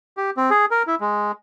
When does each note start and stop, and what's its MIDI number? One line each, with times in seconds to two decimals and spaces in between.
0.17 0.30 67
0.37 0.50 60
0.50 0.65 68
0.71 0.83 70
0.87 0.95 64
1.01 1.32 56